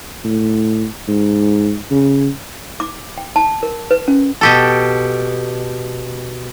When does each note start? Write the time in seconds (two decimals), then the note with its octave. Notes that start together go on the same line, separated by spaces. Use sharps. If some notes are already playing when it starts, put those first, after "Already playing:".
0.24 A2
1.08 G#2
1.91 C#3
2.80 D6
3.18 G5
3.36 A5
3.63 A#4
3.91 B4
4.08 C#4
4.41 B2 G4 A4